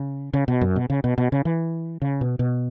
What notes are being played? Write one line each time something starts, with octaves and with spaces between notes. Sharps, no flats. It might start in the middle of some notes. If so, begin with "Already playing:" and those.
Already playing: C#3
C#3
B2
F#2
B2
C#3
B2
B2
C#3
E3
C#3
B2
B2